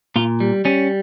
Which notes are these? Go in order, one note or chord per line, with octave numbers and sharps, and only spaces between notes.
A#2 F4
G3
G3 C#4